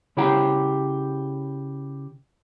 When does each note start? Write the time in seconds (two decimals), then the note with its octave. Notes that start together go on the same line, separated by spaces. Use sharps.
0.17 C#3 E4 G4 G5 A#5